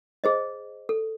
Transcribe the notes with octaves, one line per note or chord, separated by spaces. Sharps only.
G#4 C5 D#5
A4